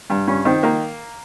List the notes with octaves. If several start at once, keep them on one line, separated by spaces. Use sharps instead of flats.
G2
G2 C#4
D#3 C4
D#3 A#3